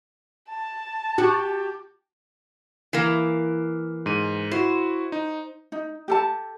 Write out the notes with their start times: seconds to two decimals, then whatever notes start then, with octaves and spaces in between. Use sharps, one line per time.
0.50 A5
1.18 F#4 G4
2.93 E3 A#3
4.06 G#2 D#7
4.51 E4 F#4 C5
5.12 D#4
5.72 D#4
6.08 G4 A4 A5